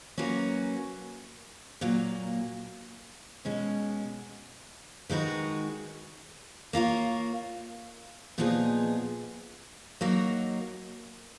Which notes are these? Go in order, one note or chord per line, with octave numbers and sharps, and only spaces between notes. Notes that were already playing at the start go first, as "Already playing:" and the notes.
F#3 A#3 C#4 F#4 B4
A#2 F#3 A#3
B2 G#3 C#4
D#3 G#3 D#4 F#4 B4
A#3 F4 A#4 C#5
A#2 F3 B3 D#4 G#4
F#3 A#3 D#4 F#4 A#4